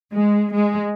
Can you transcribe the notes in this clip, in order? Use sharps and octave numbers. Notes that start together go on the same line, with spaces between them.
G#3
G#3